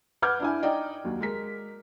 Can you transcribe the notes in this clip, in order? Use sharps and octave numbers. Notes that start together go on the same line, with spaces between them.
B4 F#5 D6 F6 G6 G#6
D4 E4 G#5
D#4 D5 D#5 G5
D#2 F#3
G#3 A#4 B6